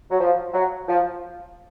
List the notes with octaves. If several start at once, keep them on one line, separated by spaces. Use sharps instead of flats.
F#3
F3
F#3
F3